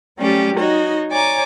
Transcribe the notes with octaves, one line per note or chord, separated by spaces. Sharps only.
F#3 G3 A3 C#4 G4
D#4 F#4 C#5 D#5
C#5 D5 G#5 A#5 D6